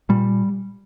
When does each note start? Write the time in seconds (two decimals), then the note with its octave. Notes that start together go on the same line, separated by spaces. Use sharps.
0.09 A#2 G3